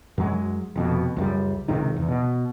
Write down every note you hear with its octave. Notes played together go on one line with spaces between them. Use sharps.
F#2 F#3 G#3
F1 F2 B2
C#2 F#2 G3
C#2 G#2 C3 D#3
E2
B2